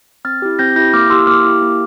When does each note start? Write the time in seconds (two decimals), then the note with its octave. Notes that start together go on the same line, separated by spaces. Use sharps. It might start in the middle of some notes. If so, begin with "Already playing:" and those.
0.25 C4 F6 A6
0.42 E4 G4
0.59 C4 G6 A#6
0.76 E4 G4 G6 A#6
0.93 A#3 D6 F6
1.10 E4 G4 C6 E6
1.27 A#3 D6 F6
1.45 E4 G4
1.62 A#3